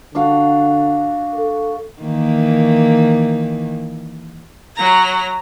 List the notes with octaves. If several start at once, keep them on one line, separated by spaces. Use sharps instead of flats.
D3 D4 F#4 F5
A4
D#3 E3 A#3
F#3 A#5